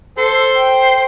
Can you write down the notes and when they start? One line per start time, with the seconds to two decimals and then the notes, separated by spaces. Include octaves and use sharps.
0.18 A4 C5
0.56 G5